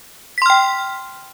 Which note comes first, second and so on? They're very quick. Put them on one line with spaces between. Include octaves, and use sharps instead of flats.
B6 C6 F6 G5